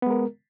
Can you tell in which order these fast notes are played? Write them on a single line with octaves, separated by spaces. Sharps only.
B3 G#3 A#4